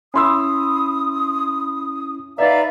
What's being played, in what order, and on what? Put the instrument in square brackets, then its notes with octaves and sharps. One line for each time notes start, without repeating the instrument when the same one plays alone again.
[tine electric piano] C#4 E4 [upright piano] B5 C6 E6 [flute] D#6
[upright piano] D#4 E5 [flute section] B4 D5 F5 [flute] A#5